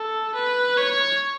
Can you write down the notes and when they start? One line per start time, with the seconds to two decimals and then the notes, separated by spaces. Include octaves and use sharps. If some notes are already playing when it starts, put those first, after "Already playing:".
Already playing: A4
0.34 B4
0.77 C#5